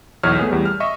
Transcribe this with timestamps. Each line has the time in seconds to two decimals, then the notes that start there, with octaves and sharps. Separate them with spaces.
0.23 B1 E2 C#5 F6
0.39 A3 B3 G#4
0.51 E2 G3
0.65 F6
0.80 D#5 E5 C#6